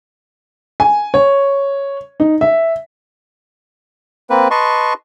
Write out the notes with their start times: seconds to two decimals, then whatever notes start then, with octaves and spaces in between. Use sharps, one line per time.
0.80 G#5
1.14 C#5
2.20 D#4
2.41 E5
4.30 A#3 C4 B4
4.51 B4 D#5 A5 C6 C#6